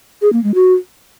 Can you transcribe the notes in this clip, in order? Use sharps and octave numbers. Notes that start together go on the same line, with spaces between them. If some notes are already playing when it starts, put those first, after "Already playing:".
G#4
A#3
G#3
F#4